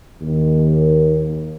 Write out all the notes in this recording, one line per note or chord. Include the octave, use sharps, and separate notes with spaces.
D#2